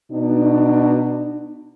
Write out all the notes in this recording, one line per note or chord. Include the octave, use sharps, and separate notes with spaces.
B2 D4 D#4